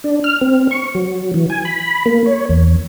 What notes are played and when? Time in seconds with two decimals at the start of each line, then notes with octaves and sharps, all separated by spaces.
0.04 D4
0.24 F6
0.41 C4
0.71 C#6
0.95 F#3
1.34 E3
1.50 G#5
1.65 B5
2.06 A#3
2.26 C#5
2.49 E2